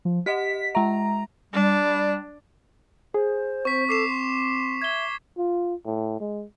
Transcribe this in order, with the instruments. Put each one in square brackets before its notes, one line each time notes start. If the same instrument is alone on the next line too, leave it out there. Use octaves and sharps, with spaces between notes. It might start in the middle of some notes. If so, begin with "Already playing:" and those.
[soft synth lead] F3
[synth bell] G4 D#5 F#5 [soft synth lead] B6
[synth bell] G#3 E5 [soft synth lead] A#5
[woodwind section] G3 [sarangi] D4
[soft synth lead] G#4 [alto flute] C5
[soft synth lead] C4 [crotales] C#6 B6
[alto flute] A4 [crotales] D6 C7 E7
[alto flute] C6
[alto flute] E5 [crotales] G#6 G7
[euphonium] F4
A2
G#3